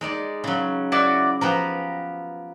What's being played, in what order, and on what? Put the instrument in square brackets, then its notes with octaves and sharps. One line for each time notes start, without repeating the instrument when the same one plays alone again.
[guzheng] G#3 D#4 D5
C#3 F#3
[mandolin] E4 F#4 D5 [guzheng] F#5
[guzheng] F3 B3 G4 [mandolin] A#5